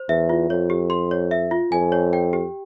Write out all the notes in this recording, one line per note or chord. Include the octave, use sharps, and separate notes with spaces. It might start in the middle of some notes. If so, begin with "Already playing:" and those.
Already playing: C5
E2 E5
F4
F2 C#5
G4
C6
C#5
E5
F4
F2 G#5
C#5
G5
G4